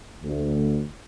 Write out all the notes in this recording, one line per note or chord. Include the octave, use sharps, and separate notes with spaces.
D2